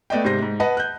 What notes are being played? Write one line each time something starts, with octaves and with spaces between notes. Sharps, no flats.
A3 B3 D5 D#5 G5
G#2 C3 C5 A#6
G#2
B4 D#5 F#5 A5
F#6 G6